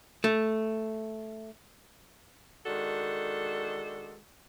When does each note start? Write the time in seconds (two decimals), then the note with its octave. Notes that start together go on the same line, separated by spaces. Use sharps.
0.24 A3
2.66 D#3 G#3 D4 F#4 A4